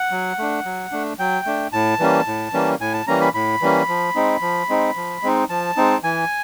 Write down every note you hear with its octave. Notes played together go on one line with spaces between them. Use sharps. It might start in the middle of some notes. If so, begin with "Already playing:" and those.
Already playing: F#5
F#3
A3 D4
F#3
A3 D4
F#3 G5
A3 D4
A2 A5
E3 G3 A#3 C#4
A2
E3 G3 A#3 C#4
A2 G#5
A5
E3 G3 A#3 C#4 A#5
B5
A2 B5
E3 G3 A#3 C#4
F3
G#3 C4 D#4
F3
G#3 C4 D#4
F3
G#3 C4 D#4
F3 A5
G#3 C4 D#4
E3 G#5